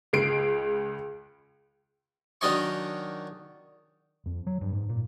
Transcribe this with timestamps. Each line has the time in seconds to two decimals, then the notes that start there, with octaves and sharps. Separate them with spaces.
0.13 C#2 G#3 C7 D7
2.41 D#3 F#3 D4 D#5 G#5 C#6
4.26 F2
4.47 F#3
4.61 G2
4.73 G#2
4.89 A#2